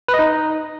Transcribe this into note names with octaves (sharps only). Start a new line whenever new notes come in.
B4
D#5
D#4